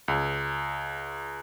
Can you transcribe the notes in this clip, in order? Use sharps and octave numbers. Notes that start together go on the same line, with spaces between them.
C#2